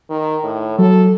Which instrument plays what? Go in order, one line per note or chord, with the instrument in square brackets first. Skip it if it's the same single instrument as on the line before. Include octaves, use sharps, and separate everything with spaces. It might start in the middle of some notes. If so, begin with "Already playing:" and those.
[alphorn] D#3
A2
[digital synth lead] F#3 [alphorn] A4